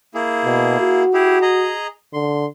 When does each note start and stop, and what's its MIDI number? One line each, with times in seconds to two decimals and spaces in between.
0.15 1.03 58
0.15 1.03 64
0.15 1.03 68
0.45 0.77 47
0.80 1.74 66
1.14 1.38 64
1.14 1.38 67
1.14 1.38 68
1.42 1.87 68
1.42 1.87 75
1.42 1.87 82
2.13 2.46 50
2.13 2.46 84